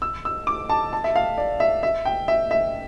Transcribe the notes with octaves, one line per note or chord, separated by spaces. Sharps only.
E6
E6
D6
A5
A5
E5
F5
D5
E5
E5
G5
E5
E5